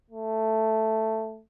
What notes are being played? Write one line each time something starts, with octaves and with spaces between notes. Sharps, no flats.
A3